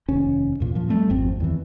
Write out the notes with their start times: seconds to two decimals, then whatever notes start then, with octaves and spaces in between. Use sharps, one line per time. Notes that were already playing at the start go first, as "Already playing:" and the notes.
0.09 F1 D#2 C#4
0.60 E2 A#2
0.75 A#2 F3
0.89 G3 A3 C4
1.10 G#1 F2 C4
1.40 E2 D#3 E3